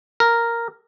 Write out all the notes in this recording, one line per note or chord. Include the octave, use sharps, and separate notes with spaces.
A#4